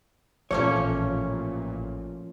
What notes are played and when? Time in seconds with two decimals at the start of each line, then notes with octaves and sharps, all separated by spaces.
0.51 A1 A#2 F3 A3 A#3 C#4 C#5